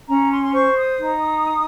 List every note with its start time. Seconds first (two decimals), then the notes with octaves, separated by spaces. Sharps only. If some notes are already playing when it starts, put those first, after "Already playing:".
0.08 C#4 A#5
0.31 C6
0.43 C6
0.53 C5 C#6
0.77 D#6
1.00 D#4